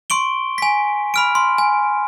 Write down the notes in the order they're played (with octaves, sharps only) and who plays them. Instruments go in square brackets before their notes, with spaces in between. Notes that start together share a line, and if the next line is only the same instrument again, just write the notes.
[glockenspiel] C6 C#6 D7 G7
G#5 B6
B5 F6 D7
C6
G#5